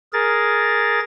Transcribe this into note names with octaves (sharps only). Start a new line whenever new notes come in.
G#4 A#4 A6